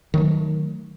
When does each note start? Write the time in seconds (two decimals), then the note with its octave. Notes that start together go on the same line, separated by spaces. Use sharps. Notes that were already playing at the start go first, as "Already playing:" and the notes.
0.14 D#3 F#3 A3